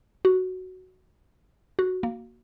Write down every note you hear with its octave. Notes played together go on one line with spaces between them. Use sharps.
F#4
F#4
A#3